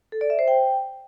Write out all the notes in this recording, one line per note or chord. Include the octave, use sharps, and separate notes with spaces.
A4
D5
E5
C5
G5